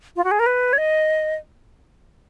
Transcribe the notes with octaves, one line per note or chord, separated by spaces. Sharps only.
F4
F#4
G#4
A#4
B4
C#5
D#5